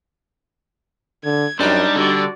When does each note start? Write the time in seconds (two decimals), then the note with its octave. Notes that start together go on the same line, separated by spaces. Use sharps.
1.24 D3 G#6
1.60 F#2 G3 D4 D#4 C5
1.96 D3 G3 F#4 D5